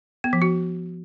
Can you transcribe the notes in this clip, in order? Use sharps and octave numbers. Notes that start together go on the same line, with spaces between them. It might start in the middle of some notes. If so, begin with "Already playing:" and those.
B3
F3
F#4